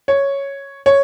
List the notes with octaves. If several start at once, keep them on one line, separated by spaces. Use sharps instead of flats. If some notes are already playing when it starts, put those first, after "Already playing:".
C#5
C#5